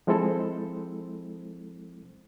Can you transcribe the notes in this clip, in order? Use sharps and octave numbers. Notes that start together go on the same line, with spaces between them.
F3 G#3 C4 E4 A4 C5